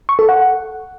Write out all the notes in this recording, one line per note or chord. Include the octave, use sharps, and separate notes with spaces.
C#6
A4
F#5